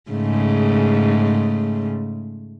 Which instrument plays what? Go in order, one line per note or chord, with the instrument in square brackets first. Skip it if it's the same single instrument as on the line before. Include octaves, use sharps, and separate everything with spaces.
[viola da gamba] G#2 C#3 A3